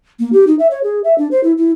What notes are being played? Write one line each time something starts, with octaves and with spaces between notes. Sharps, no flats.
A#3
G4
D#4
E5
C#5
G#4
E5
D4
C5
E4
E4